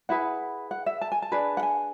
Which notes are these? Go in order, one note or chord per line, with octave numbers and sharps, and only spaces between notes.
E4 G#4 B4 F#5
F#5
E5
A5
G#5
A5
D4 G#4 B4
F#5
G#5